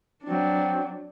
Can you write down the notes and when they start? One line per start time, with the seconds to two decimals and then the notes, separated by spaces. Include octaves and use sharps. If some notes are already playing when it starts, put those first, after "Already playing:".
0.24 F#3 C4 D4